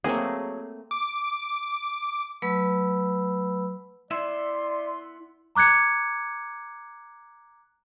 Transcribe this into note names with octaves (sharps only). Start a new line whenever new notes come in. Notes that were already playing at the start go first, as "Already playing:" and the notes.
F#3 A3 A#3 C4 G#4
D6
F#3 A3 B4 B5 E6
B3 E4 D5 E5 C6
A#5 D6 F#6 G#6 C#7